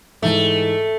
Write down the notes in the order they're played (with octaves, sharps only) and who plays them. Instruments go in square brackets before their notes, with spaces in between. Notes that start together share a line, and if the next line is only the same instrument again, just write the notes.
[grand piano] G#2 E3 G#3 [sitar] A3